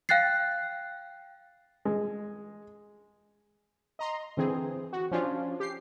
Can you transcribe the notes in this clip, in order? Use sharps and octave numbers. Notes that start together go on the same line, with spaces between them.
F5 G5 F#6 A6 C7
G#3
D#5 A#5 C6
D3 E3 C4 G#4
F#4
F3 C#4 D4 F4
G4 C7